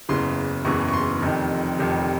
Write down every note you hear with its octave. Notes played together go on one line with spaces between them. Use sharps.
F#1 E2 C#3 E3 C6
F#1 E2 C#3 E3 C#6
C#6
C6
F1 F2 C3 D#3
F1 F2 C3 D#3